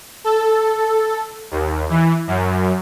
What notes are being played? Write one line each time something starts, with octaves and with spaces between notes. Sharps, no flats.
A4
D#2
E3
F#2